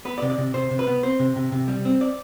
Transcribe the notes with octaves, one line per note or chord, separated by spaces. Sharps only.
B3 B4
D5
C3
D5
C3
C3 C5
C3
B4
B3
C4 C5
C3
C3
C3
G3
C4
D5